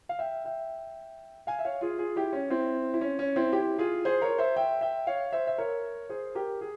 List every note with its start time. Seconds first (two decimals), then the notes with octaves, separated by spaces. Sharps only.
0.09 F5
0.19 E5 G5
0.45 E5 G5
1.47 F5 G#5
1.59 E5
1.65 C#5 F5
1.81 F4 G#4
1.98 F4 G#4
2.16 E4 G4
2.33 C#4
2.50 C4 E4
2.94 E4
3.01 C#4
3.19 C#4
3.36 C4 E4
3.53 E4 G4
3.78 F4 G#4
4.05 G#4 C5
4.22 A#4 C#5
4.38 C5 E5
4.56 E5 G5
4.81 E5 G5
5.07 C#5 F5
5.33 C5 E5
5.47 E5
5.58 A#4 C#5
6.09 G#4 C5
6.35 G4 A#4
6.61 G#4